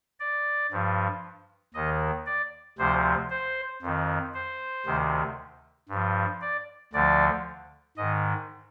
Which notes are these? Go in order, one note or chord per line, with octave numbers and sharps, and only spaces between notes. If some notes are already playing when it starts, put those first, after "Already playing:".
D5
G2 F3
D#2 D#3 D#5
D5
D2 C3 F3 C5
C5
F2 D#3
C5
D2 C3 D#3
G2
F3
D5
D2 D3 F3 D5
G#2 D#3 D#5